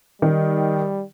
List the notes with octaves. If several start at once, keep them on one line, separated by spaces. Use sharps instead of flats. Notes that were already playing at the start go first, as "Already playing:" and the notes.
D#3 G3